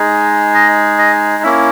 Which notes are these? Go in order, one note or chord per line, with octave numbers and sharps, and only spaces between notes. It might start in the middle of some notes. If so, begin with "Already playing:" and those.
Already playing: G#3 D#4 G#4
D#5
D#5
A#3 C#4 E4 E5